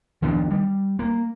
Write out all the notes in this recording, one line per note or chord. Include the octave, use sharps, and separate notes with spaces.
D#3 F3 B3 D4
G3
A#3